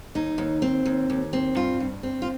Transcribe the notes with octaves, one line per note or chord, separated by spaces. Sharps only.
D#2 D#4
D#2
C4
D#2
D#2
C4
G2 F4
G2
C4
F4